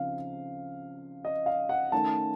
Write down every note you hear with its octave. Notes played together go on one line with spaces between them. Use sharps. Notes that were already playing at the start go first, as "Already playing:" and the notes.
Already playing: C#3 F3 C4 D#4 F5
D#5
F5
F#5
D#3 A3 C#4 A5